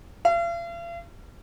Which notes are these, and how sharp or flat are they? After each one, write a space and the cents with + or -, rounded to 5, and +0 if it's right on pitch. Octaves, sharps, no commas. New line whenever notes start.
F5 -45